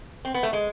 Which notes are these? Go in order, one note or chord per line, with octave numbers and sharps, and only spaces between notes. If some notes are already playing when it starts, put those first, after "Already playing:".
C4
B3
A3
G#3